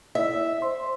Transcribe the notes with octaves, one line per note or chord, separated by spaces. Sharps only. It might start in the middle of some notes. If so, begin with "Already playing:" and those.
E4 D#5 E5
C5 C6